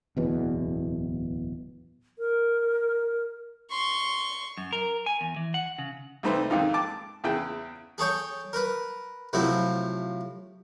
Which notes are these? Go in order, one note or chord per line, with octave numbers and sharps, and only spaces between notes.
D1 E2 B2
A#4
C6 C#6
F#2
A#4
G#5
E2
E3
F#5
C#3
C2 C3 A3 D#4 B4 C5
F2 G#2 D#3 D#4 F4
A5 D6
E2 C#3 E4 G5
G#4 A4 C#5 G5
A#4 B4
A2 C3 F3 F#3 E4